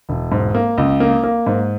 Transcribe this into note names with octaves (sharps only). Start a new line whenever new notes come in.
E1
G#2
A#3
C#2
A#3
A#3
G#2